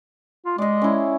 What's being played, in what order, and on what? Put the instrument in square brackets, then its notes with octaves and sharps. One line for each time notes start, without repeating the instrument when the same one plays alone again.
[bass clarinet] F4
[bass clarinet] G#3 [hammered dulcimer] D5 D#5
[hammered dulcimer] C#4 E4